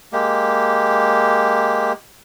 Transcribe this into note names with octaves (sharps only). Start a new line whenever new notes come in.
G#3 A#3 G4